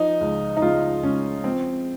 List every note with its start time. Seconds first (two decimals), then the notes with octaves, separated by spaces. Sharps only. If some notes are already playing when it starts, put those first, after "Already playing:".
Already playing: F3 D#4
0.21 C#2
0.57 D#4
0.62 C#3 F4
1.03 C#2 C#4
1.44 F3 C4